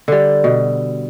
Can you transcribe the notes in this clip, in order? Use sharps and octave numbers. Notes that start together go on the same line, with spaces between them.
D3 G3
B2